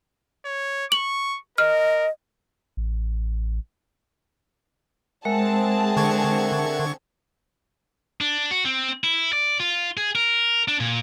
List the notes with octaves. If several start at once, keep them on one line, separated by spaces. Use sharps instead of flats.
C#5
C#6 F#7
A#4 D#5 F6
A1
G#3 C4 G#4 A#4 E5 F#5 A5
D3 C#6 G#6
D4
F#4
C4
E4
D5
F4
G#4
A#4
D4
A#2